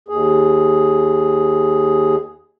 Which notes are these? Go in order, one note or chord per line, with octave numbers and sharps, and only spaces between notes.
D#2 G#4